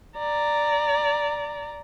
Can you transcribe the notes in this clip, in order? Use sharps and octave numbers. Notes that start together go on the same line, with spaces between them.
D5 A#5